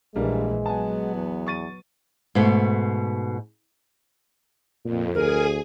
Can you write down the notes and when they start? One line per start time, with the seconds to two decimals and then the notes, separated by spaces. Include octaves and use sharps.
0.16 A#1 E3 G3 G#3 A#3 D4
0.66 F#3 B3 G#5 A5
1.15 E2
1.47 C#6 A6 D#7
2.35 G#2 B2 A3
4.85 F2 A#2
5.14 D2 G#4 A#4 G#5